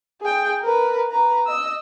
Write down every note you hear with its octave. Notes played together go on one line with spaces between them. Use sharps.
G#4 G5
A#4 B4
B4 A#5
D#5 E6